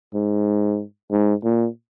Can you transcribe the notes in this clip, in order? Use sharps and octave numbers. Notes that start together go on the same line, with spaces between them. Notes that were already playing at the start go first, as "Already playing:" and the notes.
G#2
G#2
A#2